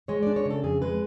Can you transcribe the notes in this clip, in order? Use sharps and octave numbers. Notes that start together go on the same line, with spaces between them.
G#3 C#5
D4 D5
C#5
C#3
A4
F2 G#4
G#3 B4